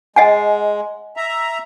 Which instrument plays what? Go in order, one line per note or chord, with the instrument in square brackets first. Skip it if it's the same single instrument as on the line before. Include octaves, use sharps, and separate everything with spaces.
[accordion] G#3 [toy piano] D#5 F#5 G#5
[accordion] E5 A#5